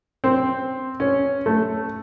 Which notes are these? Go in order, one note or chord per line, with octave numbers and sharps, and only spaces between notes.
C4
C#4
A3